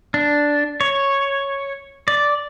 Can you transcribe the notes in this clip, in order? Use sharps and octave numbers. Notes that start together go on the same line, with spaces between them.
D4
C#5
D5